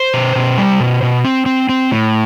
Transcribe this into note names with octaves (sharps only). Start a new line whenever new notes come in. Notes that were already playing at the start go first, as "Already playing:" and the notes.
Already playing: C5
B2
B2
G3
B2
B2
C4
C4
C4
A2